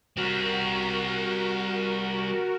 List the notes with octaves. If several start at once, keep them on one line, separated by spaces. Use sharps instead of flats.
G3 C4 F#4 A#4